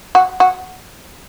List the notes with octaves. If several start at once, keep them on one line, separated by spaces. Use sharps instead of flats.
F#4
F#4